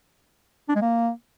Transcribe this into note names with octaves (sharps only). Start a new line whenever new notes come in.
D4
G#3
A#3